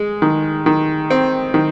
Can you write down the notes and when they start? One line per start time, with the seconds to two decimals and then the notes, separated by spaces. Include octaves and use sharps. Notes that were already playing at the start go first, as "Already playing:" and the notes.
Already playing: G#3
0.22 D#3
0.66 D#3
1.10 C4
1.54 D#3